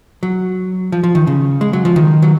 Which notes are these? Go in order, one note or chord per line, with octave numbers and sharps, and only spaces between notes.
F#3
F3
F3
D#3
C#3
G#3
F#3
F3
D#3
F#3